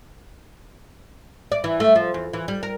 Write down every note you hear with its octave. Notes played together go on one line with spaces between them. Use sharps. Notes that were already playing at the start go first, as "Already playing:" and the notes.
D5
E3
A3
F3
E2
E3
G3
A#4